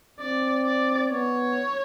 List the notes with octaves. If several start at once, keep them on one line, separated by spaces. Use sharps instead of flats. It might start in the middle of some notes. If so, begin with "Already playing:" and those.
C4 D5
D5
B3 C#5